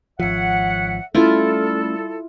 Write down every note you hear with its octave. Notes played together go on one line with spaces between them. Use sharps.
G#1 F3 C#5 E5 F#5
G3 A3 C#4 E4 F4 A4